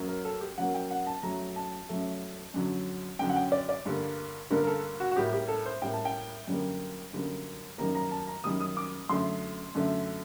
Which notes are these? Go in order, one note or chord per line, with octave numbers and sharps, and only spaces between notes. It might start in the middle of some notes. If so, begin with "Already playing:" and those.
Already playing: F#2 F#3 A#3
A#4
A4
G4
F#2 F#3 A#3 F#5
G5
F#5
A5
F#2 F#3 A3 A#5
A5
F#2 F#3 A3
F#2 D3 F#3
F#2 D3 F#3 G5
F#5
G5
D5
D5
G2 D3 G3 A#3
G2 D3 G3 A#3 A#4
A#4
A4
F#4
F#4
A2 G3 A#3 G4
G4
A4
C5
A2 G3 A#3 G5
A5
G5
F#2 D3 G3 A#3
F#2 D3 G3 A#3
F#2 D#3 G3 A#3 A#5
A#5
A5
A#5
F#2 D#3 G3 A#3 D#6
D#6
D6
F#2 D3 A3 C6
F#2 D3 A3